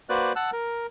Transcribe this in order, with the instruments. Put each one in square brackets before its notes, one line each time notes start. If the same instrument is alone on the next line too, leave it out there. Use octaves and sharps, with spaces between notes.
[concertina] A#3 F#4 B4 C5 D5 F#6
F#5 A5 E6 F#6
A#4